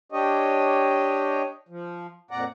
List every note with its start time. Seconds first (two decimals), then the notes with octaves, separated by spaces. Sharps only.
0.12 D4 G4 C#5 D#5
1.69 F3
2.31 F2 A#2 D5 F#5 A#5